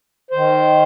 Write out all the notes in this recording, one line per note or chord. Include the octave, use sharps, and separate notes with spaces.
D#3 C5